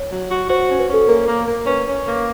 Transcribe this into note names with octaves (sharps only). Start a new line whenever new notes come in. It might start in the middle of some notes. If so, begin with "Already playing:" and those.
Already playing: C#5
F#3
F#4
F#4 C5
C#4
B4
C#4 A4
A#3 A#4
A#3
A#3
C#4 B4
C#4
A#3